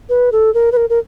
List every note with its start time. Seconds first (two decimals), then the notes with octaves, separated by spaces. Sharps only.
0.09 B4
0.32 A4
0.54 A#4
0.72 B4
0.77 A#4
0.90 A#4